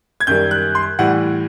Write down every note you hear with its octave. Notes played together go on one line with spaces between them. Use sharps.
G#6
F#2 D#3 G3 G6
F#6
C6
A2 E3 G3 F#5